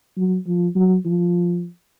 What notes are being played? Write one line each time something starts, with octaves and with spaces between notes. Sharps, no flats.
F#3
F3
F#3
F3